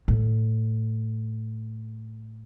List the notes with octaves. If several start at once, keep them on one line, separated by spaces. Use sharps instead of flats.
A2